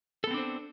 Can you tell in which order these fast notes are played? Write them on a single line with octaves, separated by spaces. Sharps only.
A4 B3 C4 D4 C5